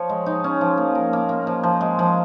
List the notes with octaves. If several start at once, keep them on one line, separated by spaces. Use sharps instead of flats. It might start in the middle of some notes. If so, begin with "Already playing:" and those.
Already playing: F3 C#5
G#3
D#4
C#4
F3
A#3
A#4
A#3
A#3
F3
F3
G#3
F3